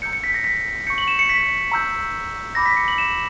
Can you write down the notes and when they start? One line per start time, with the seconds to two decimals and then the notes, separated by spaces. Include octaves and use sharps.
0.02 A#5 E6 G6 C#7
0.13 C#7
0.24 B6
0.34 A#6
0.44 B6
0.87 C#6 G6 C#7
0.98 F#7
1.08 E7
1.19 C#7
1.29 B6
1.72 A#5 E6 G6
2.55 B5 D6 G6 A#6
2.66 B6
2.77 C#7
2.88 F#7
2.98 E7